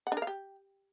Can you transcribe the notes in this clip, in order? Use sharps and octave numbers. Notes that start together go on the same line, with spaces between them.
F#5
D4
A#4
F5
G4